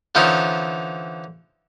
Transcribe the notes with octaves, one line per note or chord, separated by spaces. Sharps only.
D3 E3 F3 C#4 D#4